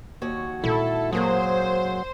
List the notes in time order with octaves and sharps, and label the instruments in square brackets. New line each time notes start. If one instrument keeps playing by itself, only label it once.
[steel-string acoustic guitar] D#2 F#4 C#5
[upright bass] A#2 G#3 [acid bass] E4 [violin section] A4
[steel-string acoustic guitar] F#2 A#3 G#4 [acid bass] F#3 [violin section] C5